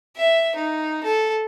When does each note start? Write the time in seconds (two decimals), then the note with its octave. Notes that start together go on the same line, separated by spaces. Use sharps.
0.17 E5
0.55 D#4
1.03 A4